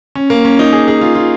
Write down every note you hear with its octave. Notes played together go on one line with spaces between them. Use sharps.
C#4
A#3
C#4
D#4
G#4
G#4
F4
F4